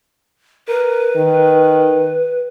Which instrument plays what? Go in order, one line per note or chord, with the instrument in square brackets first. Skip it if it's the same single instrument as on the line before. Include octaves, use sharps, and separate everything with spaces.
[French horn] A#4 [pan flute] B4
[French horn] D#3